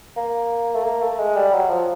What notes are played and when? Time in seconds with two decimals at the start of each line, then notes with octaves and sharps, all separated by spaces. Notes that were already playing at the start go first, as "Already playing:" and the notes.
0.17 A#3
0.75 A3
0.84 A#3
1.02 A3
1.19 G#3
1.36 G3
1.53 F#3
1.70 F3